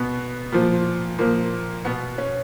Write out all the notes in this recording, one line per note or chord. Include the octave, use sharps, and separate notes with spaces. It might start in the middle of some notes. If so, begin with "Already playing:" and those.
Already playing: B2 B3
A#2 F3
A#2 F3 A#3
B2 B3
C#4